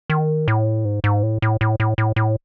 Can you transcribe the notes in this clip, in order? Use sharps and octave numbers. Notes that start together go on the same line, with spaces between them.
D#3
A2
G#2
G#2
A2
A2
A2
A2
A2
A2